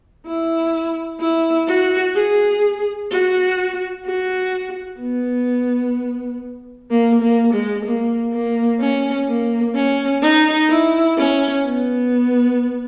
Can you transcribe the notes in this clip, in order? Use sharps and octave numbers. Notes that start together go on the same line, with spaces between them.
E4
E4
F#4
G#4
F#4
F#4
B3
A#3
A#3
G#3
A#3
A#3
C#4
A#3
C#4
D#4
E4
C#4
B3